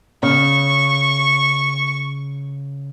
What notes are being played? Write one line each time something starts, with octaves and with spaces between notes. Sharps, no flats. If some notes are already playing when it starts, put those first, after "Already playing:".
C#3 C#6